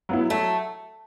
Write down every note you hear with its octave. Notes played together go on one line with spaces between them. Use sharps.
F#3 B3 E4
F#3 A3